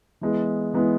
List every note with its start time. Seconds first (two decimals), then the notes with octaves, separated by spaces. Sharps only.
0.21 E3 G#3 B3
0.74 E3 G#3 B3